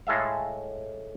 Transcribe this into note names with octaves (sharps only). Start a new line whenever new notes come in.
A2 G#3 A4 E5 F5